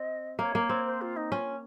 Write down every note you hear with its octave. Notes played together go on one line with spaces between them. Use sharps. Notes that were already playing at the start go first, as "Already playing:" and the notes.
Already playing: C4 D#5
A#3 C#5
A#3
C4
C5
F4
D#4
C#4 F4